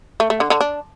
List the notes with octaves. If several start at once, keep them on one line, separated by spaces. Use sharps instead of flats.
A3
A3
D3
D3
D4